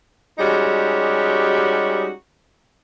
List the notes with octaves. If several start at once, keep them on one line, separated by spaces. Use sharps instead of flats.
G3 G#3 C#4 D#4 F#4 G4